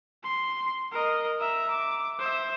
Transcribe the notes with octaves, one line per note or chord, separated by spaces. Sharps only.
C6
A#4 D#5
E5 A#5
D6
C5 E5